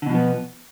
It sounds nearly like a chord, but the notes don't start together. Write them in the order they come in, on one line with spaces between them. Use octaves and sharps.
D3 B2 F3 B3